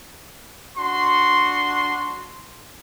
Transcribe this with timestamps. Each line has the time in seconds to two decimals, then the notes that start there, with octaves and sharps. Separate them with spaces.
0.77 D4 F#4 C6